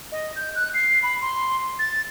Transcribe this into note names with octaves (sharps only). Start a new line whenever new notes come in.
D#5
G6
F#6
C7
B5
C6
A6